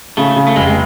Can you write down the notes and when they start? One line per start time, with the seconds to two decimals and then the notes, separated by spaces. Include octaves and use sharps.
0.17 C#3 A3
0.36 C#3
0.47 A3
0.56 F1 G#3
0.67 G#3